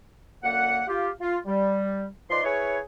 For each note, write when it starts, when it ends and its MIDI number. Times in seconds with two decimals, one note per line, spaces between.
0.43 0.82 42
0.43 0.82 50
0.43 0.82 58
0.43 0.82 78
0.88 1.09 65
0.88 1.09 67
1.21 1.37 65
1.46 2.07 55
2.30 2.43 53
2.30 2.43 63
2.30 2.43 71
2.30 2.43 74
2.30 2.43 84
2.44 2.80 64
2.44 2.80 68
2.44 2.80 71
2.44 2.80 73